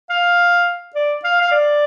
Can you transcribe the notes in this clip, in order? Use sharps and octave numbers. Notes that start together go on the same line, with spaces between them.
F5
D5
F5
F5
D5